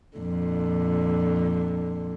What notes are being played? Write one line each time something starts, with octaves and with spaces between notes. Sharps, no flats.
F2 A#2 D3